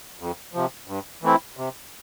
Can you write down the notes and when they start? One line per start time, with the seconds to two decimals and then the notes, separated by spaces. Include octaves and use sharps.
0.19 F2
0.53 C3 F3
0.87 G2
1.22 E3 A3 C4 E4
1.57 C3